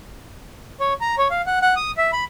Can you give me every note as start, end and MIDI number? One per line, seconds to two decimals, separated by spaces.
0.80 0.93 73
1.01 1.15 82
1.18 1.28 73
1.31 1.42 77
1.46 1.59 78
1.62 1.75 78
1.76 1.91 87
1.97 2.11 76
2.13 2.24 83